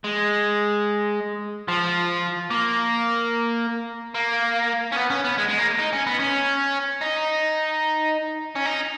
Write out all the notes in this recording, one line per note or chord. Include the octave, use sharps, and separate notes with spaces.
G#3
F3
A#3
A#3
C#4
B3
C#4
B3
G#3
G#3
A#3
D#4
C#4
B3
C#4
D#4
C#4
D#4